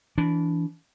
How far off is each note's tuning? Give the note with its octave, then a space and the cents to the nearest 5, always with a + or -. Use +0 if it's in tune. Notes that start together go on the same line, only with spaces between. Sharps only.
E3 +0 D4 -25